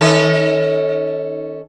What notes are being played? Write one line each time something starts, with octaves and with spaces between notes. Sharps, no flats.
D#3 C#4 A4